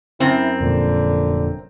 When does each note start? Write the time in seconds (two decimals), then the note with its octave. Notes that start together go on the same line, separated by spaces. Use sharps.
0.20 F#2 C4 E4
0.61 F1 A#2 D3